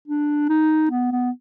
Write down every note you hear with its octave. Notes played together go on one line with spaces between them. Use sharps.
D4
D#4
B3
B3